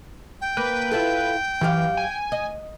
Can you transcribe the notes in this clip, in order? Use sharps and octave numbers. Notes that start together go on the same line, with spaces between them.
G5
A#3 B4
E4 F4 A4
F#2 E3 G4 F5
G#5
D#5